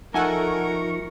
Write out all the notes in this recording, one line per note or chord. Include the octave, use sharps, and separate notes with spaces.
F3 D#4 A4 A#4 E5 F#5 G#5 C#6